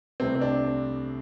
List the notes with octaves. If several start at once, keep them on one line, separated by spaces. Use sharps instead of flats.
C2 C3 A3 C4
C4
D4